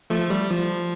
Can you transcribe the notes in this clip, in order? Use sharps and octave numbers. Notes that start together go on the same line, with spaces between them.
F3 A3
G3
F3